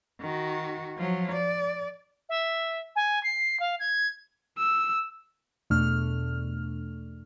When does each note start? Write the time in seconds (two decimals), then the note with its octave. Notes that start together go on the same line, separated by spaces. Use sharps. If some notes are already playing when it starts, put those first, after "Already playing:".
0.21 D#3 F#4
0.98 F3 F#3
1.32 D5
2.29 E5
2.96 G#5
3.23 C7
3.60 F5
3.79 G#6
4.58 E6
5.70 E2 B2 A3 D4 F6